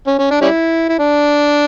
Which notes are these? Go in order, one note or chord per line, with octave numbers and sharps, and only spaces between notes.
C#4
C#4
D4
G3 C#4 E4
E4
D4